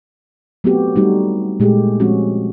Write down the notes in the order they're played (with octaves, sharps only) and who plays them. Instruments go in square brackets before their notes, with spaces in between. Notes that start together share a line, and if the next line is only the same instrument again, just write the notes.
[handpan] F#3 A3 B3 C4 F#4 G4
G3 A3 D#4 F#4
A#2 G#3 A3 G4 G#4
F3 G#3 C4 C#4 F#4